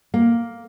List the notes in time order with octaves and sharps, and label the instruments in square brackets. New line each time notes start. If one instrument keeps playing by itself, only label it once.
[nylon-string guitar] A#3